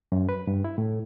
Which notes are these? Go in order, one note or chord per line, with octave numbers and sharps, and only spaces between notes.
F#2
B4
G2
E4
A2